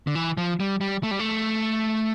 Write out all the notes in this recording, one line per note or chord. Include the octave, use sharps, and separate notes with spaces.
D3
E3
F3
G3
G3
A3
G3
A3